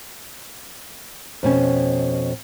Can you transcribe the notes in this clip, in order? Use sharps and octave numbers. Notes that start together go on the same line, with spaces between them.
F2 B2 C#4